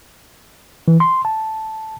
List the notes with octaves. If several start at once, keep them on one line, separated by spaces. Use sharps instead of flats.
E3
C6
A5